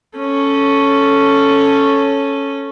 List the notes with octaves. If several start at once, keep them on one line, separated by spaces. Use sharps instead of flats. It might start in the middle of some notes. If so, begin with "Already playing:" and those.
C#4 A4